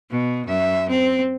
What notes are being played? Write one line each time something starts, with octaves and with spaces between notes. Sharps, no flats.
B2
F#2 E5
C4